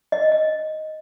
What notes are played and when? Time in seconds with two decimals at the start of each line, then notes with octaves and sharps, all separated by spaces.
0.12 D#5
0.32 D#5